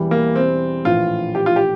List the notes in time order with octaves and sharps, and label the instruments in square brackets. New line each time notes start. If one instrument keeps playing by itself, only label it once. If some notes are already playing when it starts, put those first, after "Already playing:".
Already playing: [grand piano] E1 E2 E3 G3
[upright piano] A#3
C4
[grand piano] A#1 A2 E3 A3 [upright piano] F4
[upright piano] G4
F4
G4